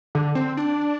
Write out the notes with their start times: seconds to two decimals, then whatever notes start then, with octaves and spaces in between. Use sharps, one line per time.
0.15 D3
0.35 C4
0.57 D4